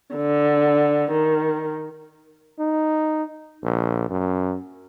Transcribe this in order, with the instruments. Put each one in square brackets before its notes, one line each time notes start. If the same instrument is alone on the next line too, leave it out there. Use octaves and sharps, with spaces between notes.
[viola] D3
D#3
[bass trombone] D#4
A#1
F#2